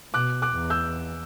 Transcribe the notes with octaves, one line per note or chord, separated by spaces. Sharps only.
B2 D6 F#6
D6 F#6
E2
E6 G6